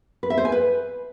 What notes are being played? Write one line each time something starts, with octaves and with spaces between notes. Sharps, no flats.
B4
E5
C5
G#5
B4